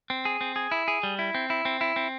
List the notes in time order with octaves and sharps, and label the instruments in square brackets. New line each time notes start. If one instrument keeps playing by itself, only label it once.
[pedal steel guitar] C4
G#4
C4
G#4
E4
G#4
G3
E4
C4
E4
C4
E4
C4